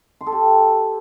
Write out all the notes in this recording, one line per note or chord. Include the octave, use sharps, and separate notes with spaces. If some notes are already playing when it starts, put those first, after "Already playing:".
C6
A4
G4